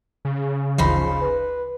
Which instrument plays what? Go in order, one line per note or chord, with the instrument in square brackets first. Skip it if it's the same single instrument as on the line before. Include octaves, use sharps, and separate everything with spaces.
[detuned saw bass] C#3
[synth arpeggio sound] G1 D2 E3 [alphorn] F3 [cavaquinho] D#4 C5 B5
[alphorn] B4